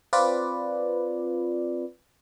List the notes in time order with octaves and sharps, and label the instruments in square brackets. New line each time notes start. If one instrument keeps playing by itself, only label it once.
[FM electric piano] C4 F4 B4 D5